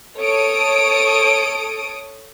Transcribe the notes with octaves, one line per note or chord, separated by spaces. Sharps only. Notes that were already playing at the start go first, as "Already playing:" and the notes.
A4 C#5 D#6 D7